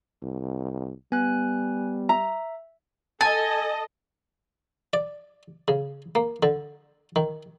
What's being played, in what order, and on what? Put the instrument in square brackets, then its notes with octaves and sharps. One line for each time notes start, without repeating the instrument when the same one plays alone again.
[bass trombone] C2
[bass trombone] G3 [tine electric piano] B3 [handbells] G#5 F#6
[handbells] E5 [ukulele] A#5
[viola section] A4 D#5 [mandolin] G#5 [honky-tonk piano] A5 [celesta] A6
[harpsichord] D5
C#3
A#3
D3
D#3